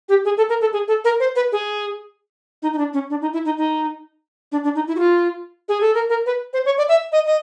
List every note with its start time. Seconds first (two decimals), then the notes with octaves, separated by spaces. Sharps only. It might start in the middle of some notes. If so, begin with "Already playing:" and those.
0.09 G4
0.25 G#4
0.37 A4
0.49 A#4
0.61 A4
0.73 G#4
0.88 A4
1.05 A#4
1.20 C5
1.36 B4
1.52 G#4
2.63 D#4
2.73 D#4
2.78 D4
2.94 C#4
3.10 D4
3.22 D#4
3.33 E4
3.45 D#4
3.58 D#4
4.52 D4
4.64 D4
4.75 D#4
4.87 E4
4.96 F#4
4.99 F4
5.69 G#4
5.81 A4
5.95 A#4
6.10 A#4
6.26 B4
6.53 C5
6.66 C#5
6.78 D5
6.89 E5
7.12 D#5
7.27 D#5